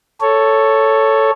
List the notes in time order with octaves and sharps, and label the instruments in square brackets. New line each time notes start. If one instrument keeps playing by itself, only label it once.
[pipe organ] A4 C#5